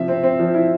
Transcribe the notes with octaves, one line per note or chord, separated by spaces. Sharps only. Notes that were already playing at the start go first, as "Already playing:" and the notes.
Already playing: C3 F3 E5
C4
C4
F3
E4